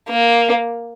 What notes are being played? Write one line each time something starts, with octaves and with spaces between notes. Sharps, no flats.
A#3